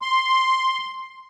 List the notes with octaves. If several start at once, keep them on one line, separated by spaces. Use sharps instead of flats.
C6